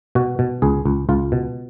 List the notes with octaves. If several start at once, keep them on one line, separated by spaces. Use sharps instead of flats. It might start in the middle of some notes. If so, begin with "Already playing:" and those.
B2 F#4
B2
C#2 G#4
C#2
C#2 F4
B2